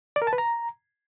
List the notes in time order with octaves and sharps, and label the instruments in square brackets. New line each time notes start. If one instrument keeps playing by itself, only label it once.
[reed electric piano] D5
A#4
A5
B4
A#5